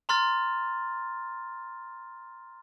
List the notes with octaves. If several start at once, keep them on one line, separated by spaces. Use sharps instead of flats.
A#5 C6 F6 A6